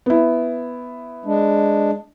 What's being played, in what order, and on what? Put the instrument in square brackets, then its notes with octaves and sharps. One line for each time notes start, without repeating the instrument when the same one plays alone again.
[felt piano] B3 E4
[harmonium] G#3 D4